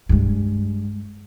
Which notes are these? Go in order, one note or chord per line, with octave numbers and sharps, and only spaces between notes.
G2 G#3